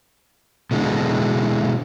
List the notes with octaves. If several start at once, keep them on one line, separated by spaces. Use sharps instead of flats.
B2 D3 E3 G3 G#3